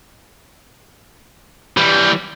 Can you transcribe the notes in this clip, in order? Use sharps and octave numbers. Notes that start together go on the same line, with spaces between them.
E3 G3